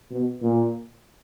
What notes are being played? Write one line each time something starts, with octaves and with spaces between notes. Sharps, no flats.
B2
A#2